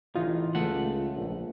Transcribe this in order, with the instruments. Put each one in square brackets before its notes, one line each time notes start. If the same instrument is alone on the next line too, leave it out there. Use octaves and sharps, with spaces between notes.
[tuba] A1 [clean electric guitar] E3 D#4 [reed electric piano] F4
[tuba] C#2 [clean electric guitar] A3 F#5
[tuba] A#1